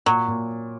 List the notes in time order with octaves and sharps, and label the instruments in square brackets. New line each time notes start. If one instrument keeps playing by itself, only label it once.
[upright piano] A#2 [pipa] F#3
[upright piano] A#2